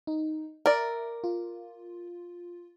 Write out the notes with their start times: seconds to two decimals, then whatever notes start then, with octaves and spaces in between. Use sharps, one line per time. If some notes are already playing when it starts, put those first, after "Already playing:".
0.07 D#4
0.66 A#4 D5 E5
1.24 F4